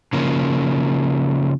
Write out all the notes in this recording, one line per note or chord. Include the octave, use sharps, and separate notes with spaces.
C#3 F3 A#3